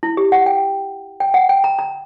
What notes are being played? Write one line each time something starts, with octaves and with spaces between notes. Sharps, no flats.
E4
G4
F#5
G5
G5
F#5
G5
A#5
A#5